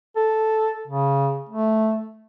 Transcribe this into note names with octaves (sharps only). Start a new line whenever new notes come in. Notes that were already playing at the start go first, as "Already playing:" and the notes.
A4
C#3
A3